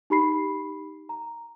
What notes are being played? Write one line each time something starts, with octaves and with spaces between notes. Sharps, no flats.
D#4 G4 B5 C7
A#5